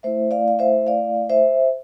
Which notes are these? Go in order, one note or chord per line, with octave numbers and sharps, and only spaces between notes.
A3 E4 C5 E5
D5 F5
F5
C5 E5
D5 F5
C5 E5